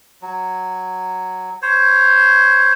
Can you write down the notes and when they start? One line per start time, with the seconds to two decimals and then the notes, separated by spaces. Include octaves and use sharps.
0.22 F#3
1.62 C5 C#5